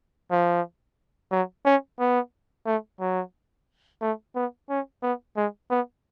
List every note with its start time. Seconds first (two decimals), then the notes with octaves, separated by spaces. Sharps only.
0.31 F3
1.32 F#3
1.66 C#4
1.99 B3
2.66 A3
3.01 F#3
4.02 A3
4.35 B3
4.70 C#4
5.03 B3
5.37 G#3
5.70 B3